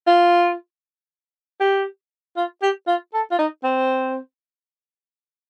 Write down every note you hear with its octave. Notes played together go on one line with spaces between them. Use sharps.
F4
G4
F4
G4
F4
A4
F4
D#4
C4